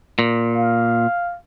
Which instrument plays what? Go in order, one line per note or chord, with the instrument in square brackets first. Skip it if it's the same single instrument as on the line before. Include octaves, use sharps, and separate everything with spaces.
[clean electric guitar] A#2
[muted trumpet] F5